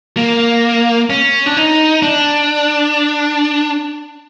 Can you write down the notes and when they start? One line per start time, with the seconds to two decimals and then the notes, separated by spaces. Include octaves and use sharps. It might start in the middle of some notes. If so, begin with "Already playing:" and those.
0.17 A#3
1.10 C#4
1.46 D4
1.57 D#4
2.02 D4